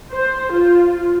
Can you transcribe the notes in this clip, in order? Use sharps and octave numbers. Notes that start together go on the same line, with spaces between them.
C5
F4